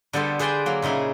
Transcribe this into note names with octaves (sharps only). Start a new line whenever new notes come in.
D3 G3 B3 A4 C5
G#4 B4 C5 D5 G5 G#5
F#3 A#3
A#2 C#3 D#4 E4 G#4